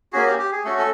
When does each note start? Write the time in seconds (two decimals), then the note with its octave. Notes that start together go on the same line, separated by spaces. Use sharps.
0.13 A#3 C#4 F#4 G#4
0.27 G4
0.39 G4
0.52 G#4
0.64 A3 C#4 F#4 A4
0.78 A4